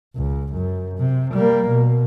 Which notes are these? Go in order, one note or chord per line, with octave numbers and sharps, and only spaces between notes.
C#2
F#2
C3
G3 A#3
B2